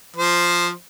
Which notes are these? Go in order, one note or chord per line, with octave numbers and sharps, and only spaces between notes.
F3 C5